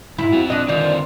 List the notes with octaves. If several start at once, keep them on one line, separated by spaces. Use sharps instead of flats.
D2 G#2 E4
C4 F4 F#4
D4 D#5 F#6
D3 D#3 C4 F4 D5